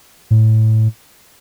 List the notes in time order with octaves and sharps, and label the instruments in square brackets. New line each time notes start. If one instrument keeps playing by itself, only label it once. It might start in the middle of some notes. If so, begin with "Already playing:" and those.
[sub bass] A2